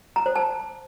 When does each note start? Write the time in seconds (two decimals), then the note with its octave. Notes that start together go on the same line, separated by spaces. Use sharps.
0.16 A#5
0.26 C5
0.36 A5